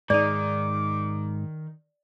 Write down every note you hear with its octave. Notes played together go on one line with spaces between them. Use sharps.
G#2 D#3 D#4 D5 D6